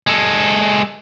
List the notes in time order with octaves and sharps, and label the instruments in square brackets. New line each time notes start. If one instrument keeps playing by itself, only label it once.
[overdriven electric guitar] G#3 A4